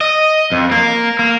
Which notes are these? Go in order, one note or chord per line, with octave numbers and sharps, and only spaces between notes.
D#5
F2
A#3
A#3